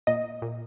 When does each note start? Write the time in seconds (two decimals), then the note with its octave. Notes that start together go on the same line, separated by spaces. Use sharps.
0.07 A#2 D#5
0.42 A#2